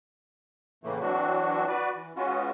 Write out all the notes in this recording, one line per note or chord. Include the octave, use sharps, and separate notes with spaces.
A2 C#3 E3 A3 A#3
E3 F#3 C4 D4 F#4
F#4 B4 D5
E3
G#3 B3 C#4 F4 F#4